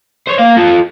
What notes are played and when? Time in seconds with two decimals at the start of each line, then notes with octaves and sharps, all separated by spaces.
0.27 C5 C#5
0.39 A#3 F5
0.57 F4 A4